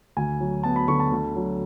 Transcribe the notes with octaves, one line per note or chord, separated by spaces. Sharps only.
D2 G#5
F#3
B3 A5
B5
D3 C#6
A5
D2
F#3